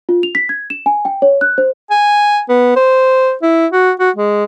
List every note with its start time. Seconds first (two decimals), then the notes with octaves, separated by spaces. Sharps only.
0.09 F4
0.23 F7
0.35 B6
0.49 G#6
0.70 E7
0.86 G#5
1.05 G5
1.22 C#5
1.41 F#6
1.58 C5
1.90 G#5
2.49 B3
2.76 C5
3.42 E4
3.72 F#4
4.00 F#4
4.16 G#3